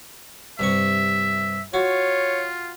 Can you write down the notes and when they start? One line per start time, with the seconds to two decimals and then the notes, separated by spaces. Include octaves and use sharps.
0.59 G2 C3 E5 C#6
1.74 F4 F#4 C#5 D6